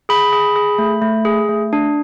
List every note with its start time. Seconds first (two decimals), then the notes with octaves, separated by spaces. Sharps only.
0.09 G#4 B5
0.33 G#4
0.56 G#4
0.78 A3
1.02 A3
1.25 G#4
1.49 A3
1.73 D4